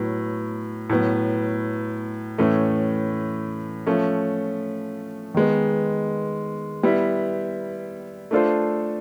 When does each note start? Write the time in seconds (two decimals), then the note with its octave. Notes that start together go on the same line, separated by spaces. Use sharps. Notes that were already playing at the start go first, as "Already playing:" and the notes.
Already playing: A2 F#3 B3
0.89 A2 F#3 B3
2.38 A2 E3 A3 C#4
3.87 F3 A3 C#4
5.34 D#3 G#3 B3
6.83 G3 B3 E4
8.31 A3 D4 F4 A4 C5